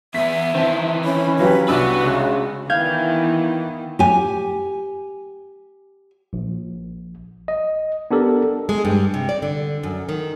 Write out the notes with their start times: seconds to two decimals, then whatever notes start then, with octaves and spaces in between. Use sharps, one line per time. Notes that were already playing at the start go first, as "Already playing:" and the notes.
0.15 E2 B3 E5 B6
0.55 D#3 E3 C4 A5
1.05 C#4 B5
1.39 F#3 F4 G4 B4
1.68 C2 B3 D4 F#4 B4 E6
2.04 C#2 C#3
2.70 D#3 E3 B3 F5 G6 G#6
3.99 G4 G#5
6.33 A#1
7.48 D#5
8.11 B3 D4 G4 A4 A#4
8.69 G#3
8.85 G2
9.14 C3
9.29 D5
9.42 D3
9.83 F#2
10.09 D#3